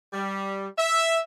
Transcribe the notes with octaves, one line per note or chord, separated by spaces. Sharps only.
G3
E5